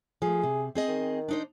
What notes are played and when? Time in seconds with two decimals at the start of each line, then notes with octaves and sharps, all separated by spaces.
0.22 F3 A3 G#4
0.43 C3
0.75 C4 G#4 D#5
0.88 D#3
1.28 D4 D#4 C5